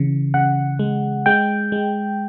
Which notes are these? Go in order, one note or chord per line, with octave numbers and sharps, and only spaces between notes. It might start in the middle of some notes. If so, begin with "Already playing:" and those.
Already playing: C#3 E3
C#3 F#5
G#3
G#3 G5
G#3